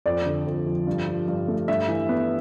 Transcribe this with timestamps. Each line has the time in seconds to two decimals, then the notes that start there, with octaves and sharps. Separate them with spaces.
0.06 F2 D5
0.26 D3
0.46 F2
0.66 F3
0.87 G2
1.07 F3
1.28 G2
1.48 A3
1.68 G2 E5
1.88 E3
2.09 B3